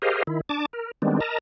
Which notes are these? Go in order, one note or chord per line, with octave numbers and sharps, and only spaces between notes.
G4 G#4 A#4 C5 D#5 F5
D#3 E4
D4 A5 D6
A#4
D#3 G3 G#3 B3 C4 D4
A#4 D#5 A5 A#5